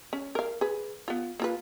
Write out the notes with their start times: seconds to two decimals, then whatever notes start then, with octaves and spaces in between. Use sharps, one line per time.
0.13 C#4
0.35 A#4 F5
0.61 G#4 B4
1.08 B3 F4
1.40 A#3 F4 B4